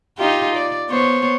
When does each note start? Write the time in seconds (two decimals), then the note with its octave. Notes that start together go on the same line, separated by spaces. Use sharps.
0.18 D#4 F4 G4
0.56 D5
0.89 B3 C5 C#5